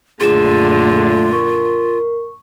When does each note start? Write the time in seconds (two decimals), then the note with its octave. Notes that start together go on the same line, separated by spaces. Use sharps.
0.21 F#2 A#2 D3 A3 F4 G#4 E7
1.33 A#4 C#6